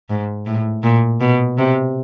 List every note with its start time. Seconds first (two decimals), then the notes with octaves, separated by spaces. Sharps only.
0.10 G#2
0.46 A2
0.83 A#2
1.21 B2
1.58 C3